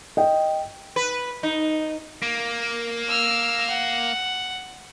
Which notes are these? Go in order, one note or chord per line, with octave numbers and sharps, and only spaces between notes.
D#5 G5
B4
D#4
A#3
E6 F6
F#5